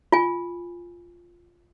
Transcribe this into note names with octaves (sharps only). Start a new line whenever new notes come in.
F4 G#5